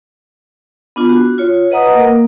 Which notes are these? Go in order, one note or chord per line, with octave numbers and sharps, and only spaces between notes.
B3 D4 F4
F#4
F4 C#5
B4 D#5 F#5 A#5 D#6
A#3 A#4